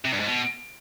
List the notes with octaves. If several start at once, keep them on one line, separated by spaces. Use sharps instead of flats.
C3
G2
G#2
B2